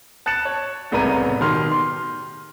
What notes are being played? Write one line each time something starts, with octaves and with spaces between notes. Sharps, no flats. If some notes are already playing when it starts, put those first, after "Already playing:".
A5 F#6 A6 C#7 E7
C#5
F#1 C2 A2 B3 A#5 D#7
B2 D#3 G4 C6 F6
C6